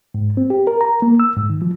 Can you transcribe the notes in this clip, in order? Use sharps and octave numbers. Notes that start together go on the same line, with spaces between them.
G#2
C4
G4
A#4
A#5
A#3
E6
G#2
D#3
F3